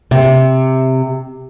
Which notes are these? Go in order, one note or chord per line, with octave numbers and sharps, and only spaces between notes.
C3